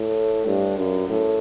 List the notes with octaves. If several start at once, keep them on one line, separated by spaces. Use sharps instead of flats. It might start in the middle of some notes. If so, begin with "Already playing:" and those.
Already playing: A2
G2
F#2
A2